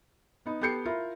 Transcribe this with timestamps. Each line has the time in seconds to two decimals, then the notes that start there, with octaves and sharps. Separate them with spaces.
0.46 B3 D#4
0.61 B3 G4 A4 G6 C7 C#7
0.85 E4 F4 A#4